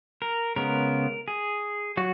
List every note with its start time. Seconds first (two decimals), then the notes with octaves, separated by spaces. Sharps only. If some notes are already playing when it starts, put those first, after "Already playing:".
0.22 A#4
0.56 C#3 G#3 B3 A#4
1.28 G#4
1.97 F#3 F#4